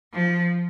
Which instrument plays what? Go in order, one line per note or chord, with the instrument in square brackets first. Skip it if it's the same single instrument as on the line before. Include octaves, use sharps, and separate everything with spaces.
[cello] F3